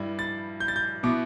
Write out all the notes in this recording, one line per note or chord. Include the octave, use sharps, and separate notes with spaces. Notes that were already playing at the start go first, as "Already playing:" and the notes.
Already playing: G2 G3 E4
A6
G6
A6
G6
B2 B3 E4 D6